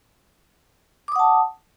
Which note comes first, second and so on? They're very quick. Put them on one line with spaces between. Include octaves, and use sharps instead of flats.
D6 D#6 F#5 A5